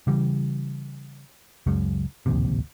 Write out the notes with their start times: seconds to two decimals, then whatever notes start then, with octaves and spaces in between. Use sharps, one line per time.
0.07 C#3 E3 G3
1.66 F#1 C#2 F#2 C#3
2.26 D1 A#1 D#2 C3